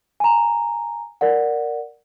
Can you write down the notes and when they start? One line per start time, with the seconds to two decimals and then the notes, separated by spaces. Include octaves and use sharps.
0.20 G#5 A#5
1.21 A#4 D5 F#5